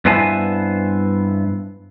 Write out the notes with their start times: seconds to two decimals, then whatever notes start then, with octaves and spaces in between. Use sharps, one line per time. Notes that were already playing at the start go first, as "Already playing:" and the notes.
0.05 G2 B3 E4 C5 G#5 A5